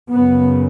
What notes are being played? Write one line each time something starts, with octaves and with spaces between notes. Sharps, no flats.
F#2 C#3 B3